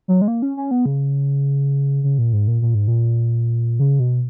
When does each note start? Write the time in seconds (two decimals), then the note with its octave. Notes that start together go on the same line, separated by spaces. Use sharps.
0.08 F#3
0.22 G#3
0.28 A#3
0.42 C#4
0.57 C#4
0.71 B3
0.86 C#3
2.04 C#3
2.18 A#2
2.33 G#2
2.47 A#2
2.62 A#2
2.74 G#2
2.88 A#2
3.79 C#3
3.99 B2